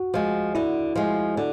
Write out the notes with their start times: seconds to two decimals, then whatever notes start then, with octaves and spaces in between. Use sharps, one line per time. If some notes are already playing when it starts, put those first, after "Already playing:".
Already playing: F#4
0.14 F3 G#3
0.55 D3 E4
0.96 F3 G#3
1.37 D3